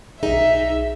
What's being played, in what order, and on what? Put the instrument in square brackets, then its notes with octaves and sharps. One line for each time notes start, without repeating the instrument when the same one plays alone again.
[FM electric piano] B1 G#4 [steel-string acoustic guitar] D#4 [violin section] E5